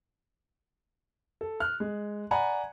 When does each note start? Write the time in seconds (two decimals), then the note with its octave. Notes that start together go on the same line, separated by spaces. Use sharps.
1.41 A4
1.60 F6 F#6
1.80 G#3
2.31 D5 F#5 G#5 A#5 B5